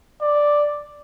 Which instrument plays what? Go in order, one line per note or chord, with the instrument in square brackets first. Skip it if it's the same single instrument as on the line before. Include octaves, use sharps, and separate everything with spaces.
[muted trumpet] D5